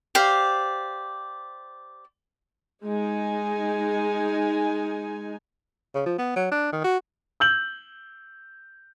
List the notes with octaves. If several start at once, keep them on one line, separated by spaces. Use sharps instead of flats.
G4 C5 D5 F5
G#3 D#4 G#5
C#3
F3
B3
F#3
D4
D#3
F#4
E6 G6 F#7